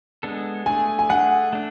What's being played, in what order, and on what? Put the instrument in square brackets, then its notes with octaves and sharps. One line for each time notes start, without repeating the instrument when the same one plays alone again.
[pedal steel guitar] G#3 B3 D4 A4
[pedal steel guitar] A3 D4 G#4 [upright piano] G#5
[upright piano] G#5
[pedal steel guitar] A3 D4 G#4 [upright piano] F#5
[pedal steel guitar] A3 D4